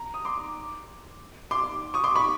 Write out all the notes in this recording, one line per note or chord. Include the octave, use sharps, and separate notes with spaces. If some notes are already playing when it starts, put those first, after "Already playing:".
Already playing: A#5
D#6
C6 D6
C6 D6
C#6 D#6
C6 D6
B5 C#6